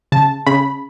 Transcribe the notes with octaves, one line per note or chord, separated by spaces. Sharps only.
C#3 A5
C#3 B5